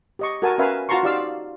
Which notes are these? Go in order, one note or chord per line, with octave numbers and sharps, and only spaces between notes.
G4 D#5 C#6
F#4 A4 A#4 G#5 A5
C#4 A#4 B4 E5 F5 G#5
F4 F#4 A5 A#5 C6 C#6
D#4 F4 G4 D5 F5 E6